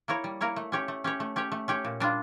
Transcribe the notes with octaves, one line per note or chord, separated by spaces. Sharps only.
A#3 E4 A#4 C#5
G3
A#3 E4 A#4 C#5
A3
C#4 G4 C#5
A3
C#4 G4 C#5
A3
C#4 G4 C#5
A3
C#4 G4 C#5
A#2
G3 D4 F4